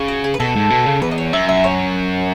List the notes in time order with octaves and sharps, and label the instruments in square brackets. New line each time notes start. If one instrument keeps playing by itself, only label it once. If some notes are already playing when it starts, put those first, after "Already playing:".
Already playing: [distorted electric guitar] C#3
[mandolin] F#4
G#4
B4
[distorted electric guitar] B2 [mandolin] A4
[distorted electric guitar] G#2
B2
C#3
[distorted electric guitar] E2 [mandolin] B4
[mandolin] D#5
C#5
[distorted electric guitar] F#2 [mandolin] E5
[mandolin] E5
C#5